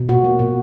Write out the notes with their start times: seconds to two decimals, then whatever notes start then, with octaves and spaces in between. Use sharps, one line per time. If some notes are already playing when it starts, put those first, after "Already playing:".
Already playing: B2
0.09 A#2 F#4
0.24 A#3
0.39 A#2